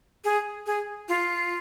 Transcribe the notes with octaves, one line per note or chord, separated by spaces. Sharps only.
G#4
G#4
F4